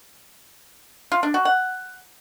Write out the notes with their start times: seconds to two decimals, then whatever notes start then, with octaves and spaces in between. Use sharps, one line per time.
1.12 F4
1.23 D4
1.34 F#4
1.45 F#5